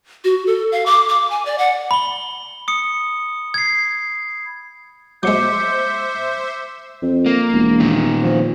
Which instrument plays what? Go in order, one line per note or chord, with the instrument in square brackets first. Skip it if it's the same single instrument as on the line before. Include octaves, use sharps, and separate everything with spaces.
[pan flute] F#4
A4
F5
D6
D6
G#5
D5
F#5
[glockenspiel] B5 G7
D#6 C#7
G#6 C7
[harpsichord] F#3 G#3 [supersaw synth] C5 E5 [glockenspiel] D6 C#7 [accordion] G6
[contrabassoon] F2
[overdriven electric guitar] A#3
[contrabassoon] E1
[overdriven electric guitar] A#2 D#3
[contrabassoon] F3